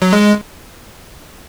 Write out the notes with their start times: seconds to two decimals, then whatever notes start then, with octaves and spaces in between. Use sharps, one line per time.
0.02 F#3
0.13 G#3